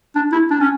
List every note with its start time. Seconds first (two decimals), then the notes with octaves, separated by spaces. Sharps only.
0.16 D4
0.32 E4
0.51 D4
0.61 C#4